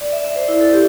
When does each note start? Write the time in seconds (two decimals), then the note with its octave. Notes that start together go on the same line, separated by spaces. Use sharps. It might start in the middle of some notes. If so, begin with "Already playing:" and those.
0.01 D5
0.12 E5
0.25 D5
0.36 C5
0.48 E4
0.61 A4
0.73 G4